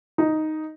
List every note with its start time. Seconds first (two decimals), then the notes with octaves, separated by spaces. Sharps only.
0.18 D#4